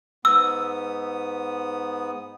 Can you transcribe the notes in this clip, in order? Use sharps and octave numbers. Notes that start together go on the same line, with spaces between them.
G#2 B3 D#6 E6